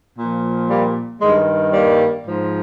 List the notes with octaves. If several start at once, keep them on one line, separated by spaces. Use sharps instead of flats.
A#2 F3
G3 A#3
G2 D#3 G#3
G3 A#3
G#2 F3